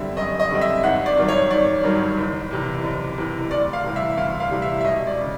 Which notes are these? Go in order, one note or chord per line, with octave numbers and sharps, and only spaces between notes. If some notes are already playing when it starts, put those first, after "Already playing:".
Already playing: F#2 D3 G3 C4 E5
F#2 D#5
D#5
D3 G3 C4
E5
G#1 F#5
D5
G2 D#3 F#3
C#5
G#1 D5
G2 D#3 F#3
F#1
E2 C3 E3
F#1
E2 C3 E3
D2 D5
F5
C3 E3 G3
E5
D2 F5
F5
C3 E3 G3
E5
E5
E1 D#5
D5
C#3